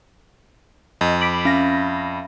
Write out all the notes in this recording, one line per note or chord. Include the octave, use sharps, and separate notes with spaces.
F2 D#5
B5 D6 B6 D7 F#7
C#4 E5 F5 B5 A#6